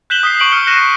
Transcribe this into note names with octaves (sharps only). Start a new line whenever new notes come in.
F#6 G6 B6 E7 F#7 G7
D#6 B6 C7
C#6 D7 F#7
F6 C#7 G7
F#6 A#6 C7 D#7 E7